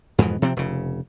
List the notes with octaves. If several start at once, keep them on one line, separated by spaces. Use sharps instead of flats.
F2 G#2 B2 E3
C3 F3 C4
F1 C#3